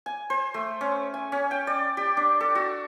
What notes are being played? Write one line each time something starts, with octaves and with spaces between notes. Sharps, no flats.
G#5
C5
A3
C#4
G#5
C#4
G5
D5
G4
D4
A4
F#4